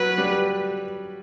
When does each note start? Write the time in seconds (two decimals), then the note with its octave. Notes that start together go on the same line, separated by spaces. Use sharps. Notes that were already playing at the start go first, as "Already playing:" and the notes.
Already playing: F#3 B4
0.18 G3